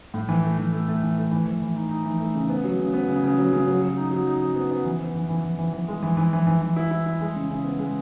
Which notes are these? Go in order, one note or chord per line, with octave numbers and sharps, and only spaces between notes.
A2
E3
A3
E3
A3
A3
E3
A3
E3
E3
E3
D#4
D#4
E3
A3
C#3
B3
F#3
C#3
B3
C#3
C#3
F#3
C#3
F#3
F#3
D#4
F#3
D#4
F#3
B3
B3
E3
B3
E3
E3
E3
E3
E3
G#3
E3
E3
E3
E3
E3
E4
E4
E4
G#3
C#3
C#3
B3
G#3